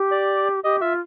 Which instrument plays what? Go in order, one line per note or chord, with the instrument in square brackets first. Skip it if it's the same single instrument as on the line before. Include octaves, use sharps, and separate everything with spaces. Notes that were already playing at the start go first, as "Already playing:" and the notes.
Already playing: [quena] G4
[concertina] D5
[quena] G4 [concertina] D#5
[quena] F4 [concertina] E5